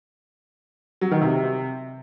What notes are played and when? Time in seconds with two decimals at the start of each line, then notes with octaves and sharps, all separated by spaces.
1.01 F#3
1.11 D#3
1.21 C3